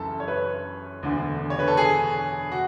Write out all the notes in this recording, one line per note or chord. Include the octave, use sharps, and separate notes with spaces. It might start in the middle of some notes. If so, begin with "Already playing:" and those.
Already playing: F#1 F#2 C#3 E3 A4
C#5
B4
E1 D2 D3
C#5
B4
A4
G#4
F#4